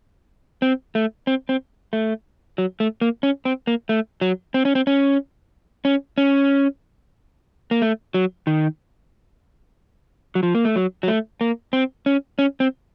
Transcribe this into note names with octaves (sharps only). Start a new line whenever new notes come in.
C4
A3
C4
C4
A3
F#3
A3
A#3
C#4
C4
A#3
A3
F#3
C4
C#4
C4
C#4
C#4
C#4
A#3
A3
F#3
D#3
F#3
F3
A#3
A3
F#3
F#3
A3
A#3
C4
C#4
C#4
C4